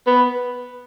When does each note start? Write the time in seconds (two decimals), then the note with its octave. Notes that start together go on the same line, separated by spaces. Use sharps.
0.07 B3